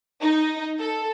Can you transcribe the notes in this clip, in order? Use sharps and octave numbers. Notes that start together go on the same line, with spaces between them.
D#4
A4